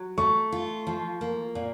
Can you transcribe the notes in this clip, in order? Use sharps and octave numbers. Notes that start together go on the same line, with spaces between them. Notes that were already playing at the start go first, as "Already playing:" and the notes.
Already playing: F#3
A3 C#6
F4
F3
A#3
A#2